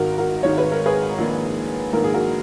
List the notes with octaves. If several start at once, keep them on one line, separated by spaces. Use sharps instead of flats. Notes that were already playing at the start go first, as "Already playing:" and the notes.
Already playing: G#1 G#2 D#3 G#3 F#4 A#4
F#4 A#4
G#1 G#2 D#3 G#3 C#5
B4
A#4
G#4 B4
A#1 G#2 D#3 A#3
A#1 G#2 D#3 A#3 A#4
G#4
F#4 A#4